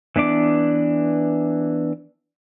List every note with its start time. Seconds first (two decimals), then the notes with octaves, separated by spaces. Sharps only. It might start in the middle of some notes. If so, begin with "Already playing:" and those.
0.16 E3 B3 D4 D6